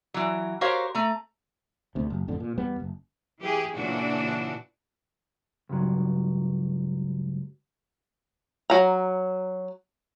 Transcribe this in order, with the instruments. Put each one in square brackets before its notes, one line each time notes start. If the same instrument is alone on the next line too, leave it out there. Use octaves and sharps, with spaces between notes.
[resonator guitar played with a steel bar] E3 F#3
F#4 G4 A#4 C5 C#5 F5
A3 A#5
[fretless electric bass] D2 C3
F#1
A1 F2 D3
A#2
E2 G3 B3
F#1
[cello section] E3 G4 G#4
A#2 C#3 E3 D4 F#4
[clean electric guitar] C#2 G2 F#3
[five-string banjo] F#3 A#5